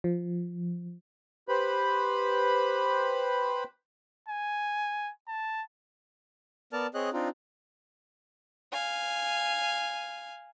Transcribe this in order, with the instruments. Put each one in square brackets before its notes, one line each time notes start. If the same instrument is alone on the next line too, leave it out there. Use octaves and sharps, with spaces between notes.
[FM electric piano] F3
[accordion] G4 B4 C5 B5
[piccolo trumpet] G#5
A5
[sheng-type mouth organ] B3 A#4 D5 A5 F6
C4 G#4 C#5 D#5 F#6
C4 D4 D#4 F4
[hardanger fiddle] F5 G#5